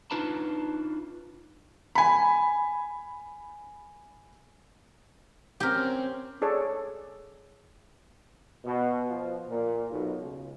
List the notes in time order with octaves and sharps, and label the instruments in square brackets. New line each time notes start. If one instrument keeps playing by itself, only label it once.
[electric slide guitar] D4 D#4 F4 B4 A5 A#5
[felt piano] G#5 B5
[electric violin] C4 C#4 [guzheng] G4 A#4
[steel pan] G#4 A4 C#5 D5
[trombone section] B2
F3
A#2
B1
C#2